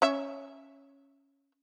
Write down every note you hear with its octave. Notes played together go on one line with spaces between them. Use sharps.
C#4 C#5 E5